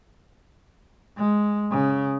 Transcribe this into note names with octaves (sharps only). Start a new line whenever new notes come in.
G#3
C#3